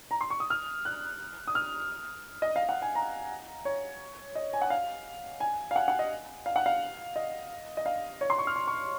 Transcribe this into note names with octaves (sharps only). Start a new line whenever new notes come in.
A#5
C6
C#6
D#6
F6
F#6
D#6
F6
D#5
F5
F#5
G#5
A#5
C#5
D#5
G#5
F#5
F5
G#5
F5
F#5
F#5
D#5
F5
F#5
F5
D#5
D#5
F5
C#5
C6
C#6
F6
C#6
C#6